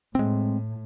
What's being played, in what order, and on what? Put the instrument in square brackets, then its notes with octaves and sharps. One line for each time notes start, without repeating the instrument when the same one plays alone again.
[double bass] A2 [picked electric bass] G#3 C4